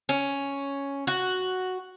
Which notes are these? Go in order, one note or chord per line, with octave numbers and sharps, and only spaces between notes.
C#4
F#4